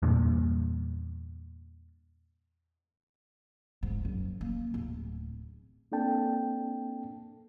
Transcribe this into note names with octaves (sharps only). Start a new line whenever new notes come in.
E2 G2 A#2
G#2
F#2
A#3
D1
A#3 C4 D4 A4 G5 A5